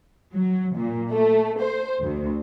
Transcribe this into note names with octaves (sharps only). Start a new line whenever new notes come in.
F#3
A#2
A3
C5
D2